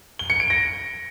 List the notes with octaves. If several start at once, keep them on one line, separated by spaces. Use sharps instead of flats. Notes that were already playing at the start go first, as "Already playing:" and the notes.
G7
C#7
D7
A#6